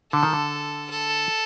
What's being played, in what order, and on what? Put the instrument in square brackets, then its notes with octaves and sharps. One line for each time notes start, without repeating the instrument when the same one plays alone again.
[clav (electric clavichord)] D3 [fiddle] A4
[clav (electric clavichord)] D#3
D3
[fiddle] A4